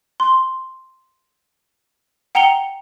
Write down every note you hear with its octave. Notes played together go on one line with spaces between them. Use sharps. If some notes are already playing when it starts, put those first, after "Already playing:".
C6
F#5 G5 A#5 C#7 F7 G7